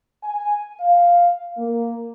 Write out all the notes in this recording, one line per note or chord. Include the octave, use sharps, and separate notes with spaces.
G#5
F5
A#3